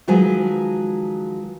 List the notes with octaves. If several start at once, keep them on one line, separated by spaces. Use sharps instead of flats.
D#3 F3 F#3 G#3 B4 G#5